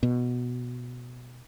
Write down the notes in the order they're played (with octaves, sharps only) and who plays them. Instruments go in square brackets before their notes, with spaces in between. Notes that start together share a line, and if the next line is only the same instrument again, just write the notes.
[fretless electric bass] B2